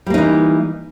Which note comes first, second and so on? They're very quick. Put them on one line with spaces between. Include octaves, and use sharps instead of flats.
G3 A#3 D#4 E3